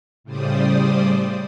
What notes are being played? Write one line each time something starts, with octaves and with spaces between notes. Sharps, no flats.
A2 C#3 G3 C5 D5 D#6